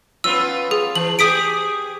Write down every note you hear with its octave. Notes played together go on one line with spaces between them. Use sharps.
B3 C#4 F4 E6
G#4
E3 F#7
G4 G#4 D#6 B6 D7